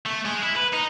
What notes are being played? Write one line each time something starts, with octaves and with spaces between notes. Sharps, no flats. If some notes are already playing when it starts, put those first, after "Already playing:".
A3
G#3
E4
B4
D#4